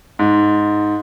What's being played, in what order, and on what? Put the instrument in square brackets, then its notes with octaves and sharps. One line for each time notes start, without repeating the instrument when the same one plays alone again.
[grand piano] G#2